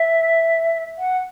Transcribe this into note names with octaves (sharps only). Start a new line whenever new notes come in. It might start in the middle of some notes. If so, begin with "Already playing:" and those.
Already playing: E5
F#5